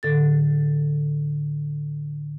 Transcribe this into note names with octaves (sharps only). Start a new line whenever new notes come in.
A2 D3 A4 A6